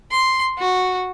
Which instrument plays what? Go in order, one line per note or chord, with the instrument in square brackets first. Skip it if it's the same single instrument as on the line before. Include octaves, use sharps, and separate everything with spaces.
[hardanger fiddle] C6
F#4